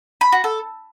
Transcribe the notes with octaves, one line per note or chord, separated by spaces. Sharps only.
B5
F#4
A4